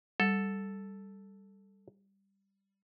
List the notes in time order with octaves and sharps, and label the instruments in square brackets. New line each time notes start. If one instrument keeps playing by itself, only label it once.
[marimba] G3 [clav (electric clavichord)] A4